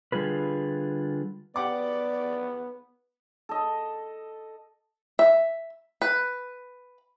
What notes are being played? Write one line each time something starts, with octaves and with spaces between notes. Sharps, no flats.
D3 G3 F4 G#4 B4
B3 G4 D5 F#5 D6
A4 D#5
E5
B4